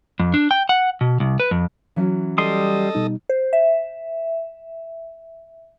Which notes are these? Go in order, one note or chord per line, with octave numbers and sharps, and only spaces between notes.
F2
D4
G5
F#5
B2
C2
B4
F2
E3 F#3 C#4
G3 A4 D#5 C6 D#6
B2 G3 D#4
C5
E5